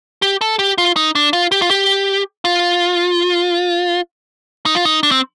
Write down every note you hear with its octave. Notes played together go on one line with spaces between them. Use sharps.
G4
A4
G4
F4
D#4
D4
F4
G4
F4
G4
F4
D#4
F4
D#4
D4
C4